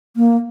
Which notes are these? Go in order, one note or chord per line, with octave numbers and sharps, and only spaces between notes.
A#3